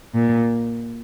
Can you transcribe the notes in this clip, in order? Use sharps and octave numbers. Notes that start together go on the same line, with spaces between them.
A#2